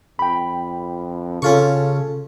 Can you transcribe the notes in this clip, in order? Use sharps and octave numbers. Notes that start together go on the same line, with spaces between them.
F2 G5 B5
C#3 C#4 F4 A4 C#6